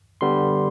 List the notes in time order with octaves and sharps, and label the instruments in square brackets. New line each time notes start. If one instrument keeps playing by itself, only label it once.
[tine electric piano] D3 G3 B3 C6